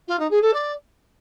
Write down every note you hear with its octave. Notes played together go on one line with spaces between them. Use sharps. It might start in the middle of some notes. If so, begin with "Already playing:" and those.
F4
D#4
G#4
A4
D5